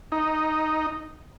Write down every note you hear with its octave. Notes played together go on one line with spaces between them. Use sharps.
D#4